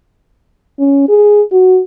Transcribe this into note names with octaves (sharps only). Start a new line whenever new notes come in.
C#4
G#4
F#4